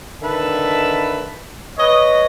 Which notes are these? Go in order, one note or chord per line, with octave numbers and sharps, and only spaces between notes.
D3 D#3 B4 E5 A5
B4 C#5 D#5